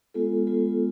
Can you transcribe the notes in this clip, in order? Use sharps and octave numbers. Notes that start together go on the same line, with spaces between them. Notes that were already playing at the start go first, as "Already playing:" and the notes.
G#3 B3 F4 A4
G#3 B3 F4 A4